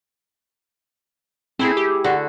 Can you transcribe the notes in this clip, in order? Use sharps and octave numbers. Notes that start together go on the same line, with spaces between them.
A3 C4 E4 G#4
G4
D3 F#4